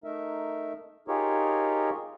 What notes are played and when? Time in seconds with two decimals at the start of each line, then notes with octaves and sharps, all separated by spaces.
0.04 A3 D#4 A#4 E5
1.08 D#4 F4 G4 G#4 A#4 C#5